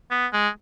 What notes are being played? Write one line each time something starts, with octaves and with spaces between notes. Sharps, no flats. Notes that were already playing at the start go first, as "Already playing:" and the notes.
B3
G#3